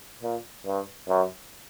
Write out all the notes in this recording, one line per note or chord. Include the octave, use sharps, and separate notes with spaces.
A#2
G2
F#2